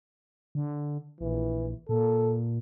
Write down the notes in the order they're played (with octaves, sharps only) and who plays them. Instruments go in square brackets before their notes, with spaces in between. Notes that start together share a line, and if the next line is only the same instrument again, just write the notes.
[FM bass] D3
[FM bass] A#1 [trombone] E3
[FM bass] A#2 [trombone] A4